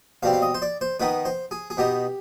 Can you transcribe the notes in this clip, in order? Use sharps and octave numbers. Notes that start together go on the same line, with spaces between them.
B2 G3 C4 F5
F5
D#5
C5
D5
C5
D#3 B3 D#4 B4
C5
G#4
G#4
B2 B3 D#4 G4